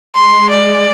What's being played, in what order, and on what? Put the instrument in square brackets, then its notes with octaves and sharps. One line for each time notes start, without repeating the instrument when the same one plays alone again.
[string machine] G#3 [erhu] C6
[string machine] G#3 [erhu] D5